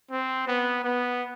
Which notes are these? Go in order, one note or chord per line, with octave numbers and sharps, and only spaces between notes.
C4
B3
B3